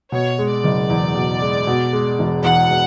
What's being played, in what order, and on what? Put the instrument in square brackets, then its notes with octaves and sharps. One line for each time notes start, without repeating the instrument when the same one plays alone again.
[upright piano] B2 [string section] C#5
[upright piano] G#3
[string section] D5
[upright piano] F#1
E2
B2
G#3
B2
G#3
E1
[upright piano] E2 [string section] F#5
[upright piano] B2